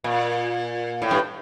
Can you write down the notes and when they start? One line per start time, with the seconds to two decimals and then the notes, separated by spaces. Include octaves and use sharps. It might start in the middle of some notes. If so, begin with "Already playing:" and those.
0.04 A#2
1.02 A2
1.11 G2